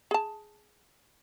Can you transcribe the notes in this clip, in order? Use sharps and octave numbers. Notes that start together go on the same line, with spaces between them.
G#4 A5